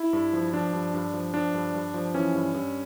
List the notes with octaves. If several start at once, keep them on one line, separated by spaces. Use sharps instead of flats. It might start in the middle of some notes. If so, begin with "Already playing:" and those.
Already playing: E4
G2
F3
F3 D4
G2
G2
F3
F3 D4
G2
G2
F3
E3 C#4
G2
G2